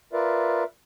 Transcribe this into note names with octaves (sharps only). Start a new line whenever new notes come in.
F4 A#4 B4 D5 E5